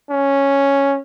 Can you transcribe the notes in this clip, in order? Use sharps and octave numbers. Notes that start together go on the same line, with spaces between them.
C#4